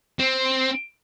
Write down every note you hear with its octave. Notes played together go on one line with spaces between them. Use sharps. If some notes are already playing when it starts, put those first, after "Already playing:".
C4